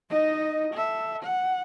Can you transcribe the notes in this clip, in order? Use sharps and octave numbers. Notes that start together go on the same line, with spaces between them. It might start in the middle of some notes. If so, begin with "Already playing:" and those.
D#4 D#5
A4 E5
F#5